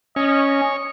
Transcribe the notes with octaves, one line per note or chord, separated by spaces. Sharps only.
C#4 C#5 D#5